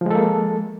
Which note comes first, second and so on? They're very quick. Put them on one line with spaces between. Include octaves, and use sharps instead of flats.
F3 G#3 A4 A#3